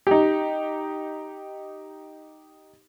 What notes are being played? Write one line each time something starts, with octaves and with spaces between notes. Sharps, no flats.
D#4 G4